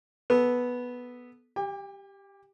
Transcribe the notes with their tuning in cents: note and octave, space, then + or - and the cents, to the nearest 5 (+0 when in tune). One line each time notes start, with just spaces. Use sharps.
B3 -5 A4 -15
G4 +0 G5 +45